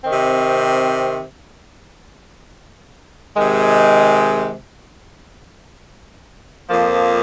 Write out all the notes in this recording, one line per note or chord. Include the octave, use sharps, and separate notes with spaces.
C3 D#3 C4
C3 D#3 G#3
F2 F3 A#3